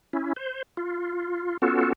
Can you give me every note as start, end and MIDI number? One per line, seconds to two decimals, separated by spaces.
0.13 0.33 61
0.13 0.33 64
0.36 0.63 72
0.77 1.57 65
1.62 1.93 59
1.62 1.93 61
1.62 1.93 65
1.62 1.93 66
1.62 1.93 69